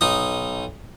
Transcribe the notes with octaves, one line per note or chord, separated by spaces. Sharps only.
B1 D#4 D#6